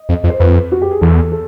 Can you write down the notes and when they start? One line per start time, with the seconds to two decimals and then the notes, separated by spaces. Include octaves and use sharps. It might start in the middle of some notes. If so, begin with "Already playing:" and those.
Already playing: D#5
0.09 F2
0.24 F2
0.29 C5
0.40 F2 B4
0.72 F#4
0.82 G4
0.91 G#4
1.01 E2 A4
1.32 A4